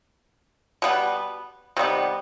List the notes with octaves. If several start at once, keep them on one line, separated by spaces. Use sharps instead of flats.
B2 G3 B3
C3 D#3 G3 B3